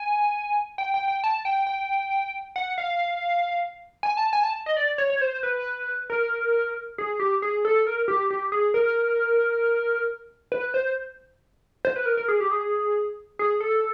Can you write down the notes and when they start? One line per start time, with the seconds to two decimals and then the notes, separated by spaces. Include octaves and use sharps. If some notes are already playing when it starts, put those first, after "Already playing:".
Already playing: G#5
0.78 G5
0.94 G5
1.08 G5
1.24 A5
1.45 G5
1.67 G5
2.56 F#5
2.78 F5
4.03 G#5
4.17 A5
4.33 G#5
4.43 A5
4.66 D#5
4.77 D5
4.98 C#5
5.10 C#5
5.21 C5
5.43 B4
6.10 A#4
6.98 G#4
7.20 G4
7.42 G#4
7.65 A4
7.87 A#4
8.08 G4
8.30 G4
8.52 G#4
8.74 A#4
10.52 B4
10.74 C5
11.85 C5
11.96 B4
12.06 A#4
12.17 A#4
12.28 G#4
12.40 G4
12.51 G#4
13.39 G#4
13.60 A4